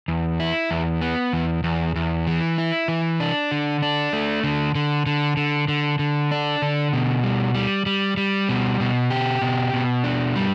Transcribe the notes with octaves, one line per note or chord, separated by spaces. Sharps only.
E2
E4
E2
B3
E2
E2
E2
E3
E4
E3
D4
D3
D4
A3
D3
D3
D3
D3
D3
D3
D4
D3
B2
G3
G3
G3
G3
B2
B2
G4
B2
B2
D4
G3